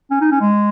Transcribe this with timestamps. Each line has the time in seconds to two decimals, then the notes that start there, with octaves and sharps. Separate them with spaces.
0.11 C#4
0.21 D#4
0.31 C#4
0.41 G#3